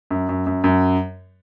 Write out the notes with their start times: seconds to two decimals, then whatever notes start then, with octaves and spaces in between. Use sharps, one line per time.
0.11 F#2
0.29 F#2
0.47 F#2
0.64 F#2